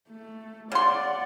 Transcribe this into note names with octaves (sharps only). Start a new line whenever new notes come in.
A3
C#3 D5 F#5 C6